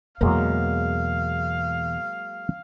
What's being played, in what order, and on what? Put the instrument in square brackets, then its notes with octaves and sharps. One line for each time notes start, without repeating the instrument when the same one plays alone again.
[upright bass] E2 B2 [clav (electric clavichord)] F#3 G#3 A#3 [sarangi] F5